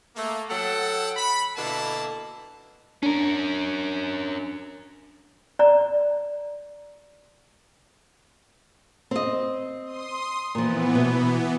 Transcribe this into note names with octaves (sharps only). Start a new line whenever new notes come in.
A3 A#3
F#3 A4 F#5 G5 A5
B5
B2 D3 A#3 E4 A5
C#4 D4 A#4
D5 A#5
C4 D#5
C6 D#6
A#2 E3 F3 B3
B2